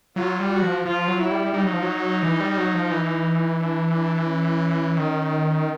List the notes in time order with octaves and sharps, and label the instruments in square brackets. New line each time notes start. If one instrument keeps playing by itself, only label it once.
[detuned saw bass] F#3 [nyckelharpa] F4
[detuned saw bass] G3
[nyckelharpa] F#4
[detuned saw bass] F3
[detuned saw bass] F3 [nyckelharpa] F4
[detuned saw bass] F#3
[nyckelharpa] E4
[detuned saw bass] G3
[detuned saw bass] G3 [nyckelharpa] D#4
[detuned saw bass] F#3
F3
F#3
E3
G3
F#3
F3
E3
[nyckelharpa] D4
D4
C#4
[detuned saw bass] D#3